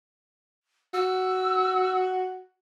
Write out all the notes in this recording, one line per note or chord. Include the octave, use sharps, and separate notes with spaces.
F#4 E6